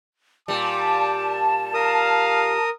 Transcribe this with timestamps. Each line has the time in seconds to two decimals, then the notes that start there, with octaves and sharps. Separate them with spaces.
0.48 A#2 G3 A5 D6
1.74 A#4 F5 D#6